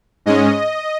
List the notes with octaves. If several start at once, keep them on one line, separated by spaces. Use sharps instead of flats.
G#2 G#3 C#4 D#5